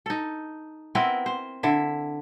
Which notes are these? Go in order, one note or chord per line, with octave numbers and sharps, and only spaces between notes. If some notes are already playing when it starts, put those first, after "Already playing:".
D#4 A4
B3 C4 E4 A#4
C5
D3 E4 E5